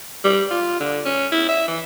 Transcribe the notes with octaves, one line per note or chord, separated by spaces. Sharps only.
G3
F4
D3
C#4
E4
E5
E3